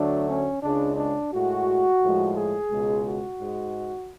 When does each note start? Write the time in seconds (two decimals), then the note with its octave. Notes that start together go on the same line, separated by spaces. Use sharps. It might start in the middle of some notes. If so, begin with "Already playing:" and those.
Already playing: D2 D3 F#3 A3 D4
0.28 C#4
0.62 C#2 C#3 G#3 D4
0.97 D4
1.32 A2 G#3 F#4
2.01 A2 F3 G#3
2.35 G#4
2.70 C#2 B2 G#3
3.04 F#4
3.38 G#2 G#3